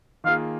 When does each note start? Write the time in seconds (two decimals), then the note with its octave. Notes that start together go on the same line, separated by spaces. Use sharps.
0.24 D#3 A#3 F4 G#4 F5